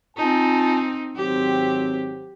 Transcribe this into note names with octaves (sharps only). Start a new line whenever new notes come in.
C4 D#4 F4 G#5 A5
G#1 F#3 C4 G4